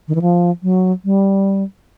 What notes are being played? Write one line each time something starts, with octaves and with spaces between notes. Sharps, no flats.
D#3
E3
F3
F#3
G3